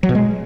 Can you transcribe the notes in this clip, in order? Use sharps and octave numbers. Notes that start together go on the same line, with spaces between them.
F#3
B2
G#3